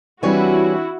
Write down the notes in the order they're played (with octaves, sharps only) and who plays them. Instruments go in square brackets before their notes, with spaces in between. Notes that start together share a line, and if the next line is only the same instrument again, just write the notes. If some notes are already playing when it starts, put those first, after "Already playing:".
[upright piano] E3 C4 D4 [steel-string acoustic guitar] G3 C#5 G#5 [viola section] E4 F#4